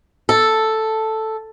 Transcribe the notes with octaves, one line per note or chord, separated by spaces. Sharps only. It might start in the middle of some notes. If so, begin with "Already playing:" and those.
A4